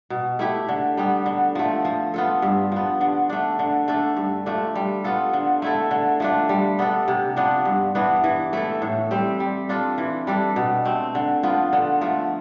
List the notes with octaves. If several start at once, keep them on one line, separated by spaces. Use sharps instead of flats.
B2
A3 E4 G4
D3
G3 B3
D3
F3 A3
F3
B3 F4 A4
G2
F3 B3
D3
A3 D4
D3
A3 D4 A4
G2
F3 A3 D4
G3
B3 F4 A4
D3
A3 E4 A4
D3
F3 A3 D4
G3
B3 D4 A4
C3
F3 B3 D4
G2
E3 B3 D4
E3
A3 E4 A4
A2
G3 C4 G4
G3
D4 F4 A4
E3
G3 D4 A4
B2
A3 C4
D3
F3 B3 F4
D3
F3 A3